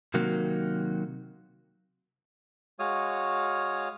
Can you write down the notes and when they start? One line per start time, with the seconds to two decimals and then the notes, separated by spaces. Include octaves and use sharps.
0.14 C3 D#3 F#3 A#3
2.79 G#3 F#4 C#5 F5 D#6